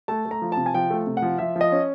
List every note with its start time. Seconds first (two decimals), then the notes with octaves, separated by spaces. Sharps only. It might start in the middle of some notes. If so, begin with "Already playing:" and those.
0.08 A3 A5
0.26 A3
0.31 A#5
0.42 F3
0.52 A5
0.57 C3
0.66 G#5
0.74 F3 G5
0.90 A3
1.07 C3
1.17 F#5
1.22 F3
1.38 F3 E5
1.56 F3
1.61 D#5
1.72 C#4